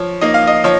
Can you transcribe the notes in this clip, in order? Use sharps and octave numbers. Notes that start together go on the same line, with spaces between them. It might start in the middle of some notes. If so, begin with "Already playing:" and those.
Already playing: F3 C#5
A#3 D#4 D#5
F5
D#5
F3 C#5